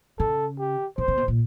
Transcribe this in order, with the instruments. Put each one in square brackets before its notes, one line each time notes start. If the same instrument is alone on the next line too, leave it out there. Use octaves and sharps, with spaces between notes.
[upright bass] C#3 [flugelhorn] A4
[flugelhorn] G4
[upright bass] C3 [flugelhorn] C5
[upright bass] C3
B2
A#2